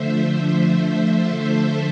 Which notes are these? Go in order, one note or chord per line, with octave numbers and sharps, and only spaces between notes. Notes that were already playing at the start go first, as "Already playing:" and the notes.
Already playing: D3 F3 A3 C5 E5
A4 C5